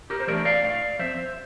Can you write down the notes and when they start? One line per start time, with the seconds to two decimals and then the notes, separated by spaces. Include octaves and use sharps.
0.10 G4 A#4
0.20 C5
0.27 E3 A3 D4 A#4 D5
0.45 D5 F5
0.63 A2 D5 F5
0.99 F3 C4 C5 E5